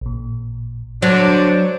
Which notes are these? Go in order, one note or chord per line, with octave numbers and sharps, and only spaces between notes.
A1 A#2
D3 F#3 D4 C5 F#6